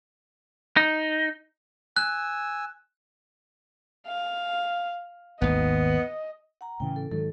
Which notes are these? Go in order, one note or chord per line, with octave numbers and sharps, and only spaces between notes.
D#4
G#5 E6 F#6
F5
G#1 D#2 B3 D#5
F#5 A#5
A2 C#3 E3 G5
A4
G#2 D#3 F#3 A4